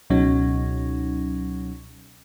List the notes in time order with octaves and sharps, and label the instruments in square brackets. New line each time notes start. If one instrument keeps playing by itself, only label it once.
[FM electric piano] C#2 B2 F#3 C#4 D#4